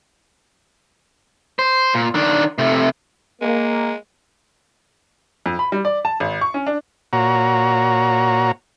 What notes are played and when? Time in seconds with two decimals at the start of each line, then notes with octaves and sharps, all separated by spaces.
1.59 C5
1.94 A#2
2.15 D#3 D4
2.58 C3 A3
3.42 G#3 A#3
5.46 F2
5.59 B5
5.72 G3
5.85 D5
6.05 A5
6.20 G#1
6.41 C#6
6.54 C#4
6.67 D4
7.13 A#2 F#4 C#5 A#5